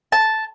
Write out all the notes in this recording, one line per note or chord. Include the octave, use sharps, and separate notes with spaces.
A5